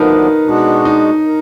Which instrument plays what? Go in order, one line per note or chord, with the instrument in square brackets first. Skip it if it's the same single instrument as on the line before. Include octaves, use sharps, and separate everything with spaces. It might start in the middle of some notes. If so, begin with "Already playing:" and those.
Already playing: [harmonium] D2 D3 F3 B3 D4 [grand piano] D#4 A#4 B4
[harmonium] B2 G#3 B3 D4 F#4
[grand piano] D#4
[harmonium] A#4